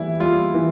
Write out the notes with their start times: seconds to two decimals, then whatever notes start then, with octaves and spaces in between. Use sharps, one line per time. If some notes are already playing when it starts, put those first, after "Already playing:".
Already playing: E3 G3 E4
0.20 G3 F4
0.54 E3